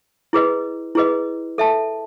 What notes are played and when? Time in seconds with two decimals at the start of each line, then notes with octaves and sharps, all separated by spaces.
0.33 E4 G#4 B4 D#5
0.95 E4 G#4 B4 D#5
1.58 A4 E5 A5